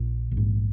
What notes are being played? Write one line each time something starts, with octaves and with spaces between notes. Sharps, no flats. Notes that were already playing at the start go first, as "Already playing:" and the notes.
Already playing: A#1 A#2
A#1
G#2